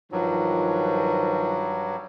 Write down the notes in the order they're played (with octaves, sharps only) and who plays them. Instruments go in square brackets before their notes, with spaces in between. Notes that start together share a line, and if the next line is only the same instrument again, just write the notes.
[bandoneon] G2 F#3 [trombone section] D#3 F3